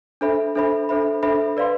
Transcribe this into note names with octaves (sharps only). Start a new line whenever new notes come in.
D4 A4 C5 E5 B5
D4 A4 C5 E5 B5
D4 A4 C5 E5 B5
D4 A4 C5 E5 B5
B4 D5 F5 C6